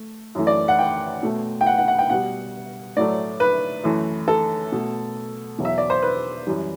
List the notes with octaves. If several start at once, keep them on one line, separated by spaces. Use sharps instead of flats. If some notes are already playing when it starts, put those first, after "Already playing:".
Already playing: A3
F#2 E3 A3
D5
F#5
G5
B2 A3
G5
F#5
F#5
F#5
G5
B2 G3 F#5
A2 F#3 A3 D5
B4
F#2 E3 A3
A4
B2 A3
E2 B2 F#3
E5
D5
C5
B4
F#2 E3 G3